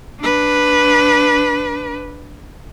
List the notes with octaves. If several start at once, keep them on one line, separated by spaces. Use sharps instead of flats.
D4 B4